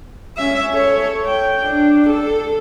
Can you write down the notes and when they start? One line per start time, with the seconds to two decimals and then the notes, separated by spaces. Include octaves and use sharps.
0.37 C#4 E5
0.73 A4 C#5
1.26 G5
1.63 D4
2.09 A4